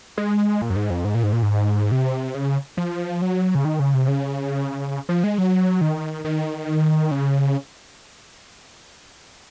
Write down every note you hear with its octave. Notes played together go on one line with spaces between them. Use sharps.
G#3
A#2
F#2
G#2
F2
G#2
A#2
G#2
A#2
G#2
C3
C#3
F3
F#3
C#3
D#3
C#3
C3
C#3
F3
G#3
F#3
D#3
D#3
C#3